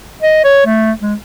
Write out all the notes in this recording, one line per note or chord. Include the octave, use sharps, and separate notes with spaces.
D#5
C#5
A3
G#3